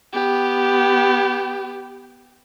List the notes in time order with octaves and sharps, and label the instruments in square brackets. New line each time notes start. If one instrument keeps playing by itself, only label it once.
[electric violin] B3 G4